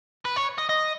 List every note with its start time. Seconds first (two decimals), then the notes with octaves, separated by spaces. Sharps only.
0.25 B4
0.36 C#5
0.58 D#5
0.69 D#5